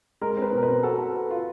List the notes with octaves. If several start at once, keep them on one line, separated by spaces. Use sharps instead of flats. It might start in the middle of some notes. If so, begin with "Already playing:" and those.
G#3 A#4
C4
B4
B2
A#4
B4
C4
F#4 A4
A4
A4
F4